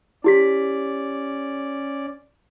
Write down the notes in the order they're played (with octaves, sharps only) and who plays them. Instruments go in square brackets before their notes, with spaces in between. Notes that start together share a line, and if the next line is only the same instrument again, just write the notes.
[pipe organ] C#4 D5 [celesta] E4 G4 B6